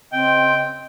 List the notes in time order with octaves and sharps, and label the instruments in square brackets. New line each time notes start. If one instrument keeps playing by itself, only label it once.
[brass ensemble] C#3 D#5 [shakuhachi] C4 [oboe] G5